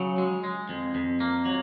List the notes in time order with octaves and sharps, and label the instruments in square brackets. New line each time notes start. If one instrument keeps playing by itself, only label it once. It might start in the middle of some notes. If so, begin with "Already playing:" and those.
Already playing: [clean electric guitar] C#3 [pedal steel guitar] F#3
[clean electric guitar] G#3
G#3
F2
F2
A#3
F#3